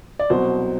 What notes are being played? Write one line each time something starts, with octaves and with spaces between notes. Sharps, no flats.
D5
C2 B2 F#3 C5